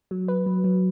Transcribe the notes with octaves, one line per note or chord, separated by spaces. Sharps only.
F#3
B4
F#3
F#3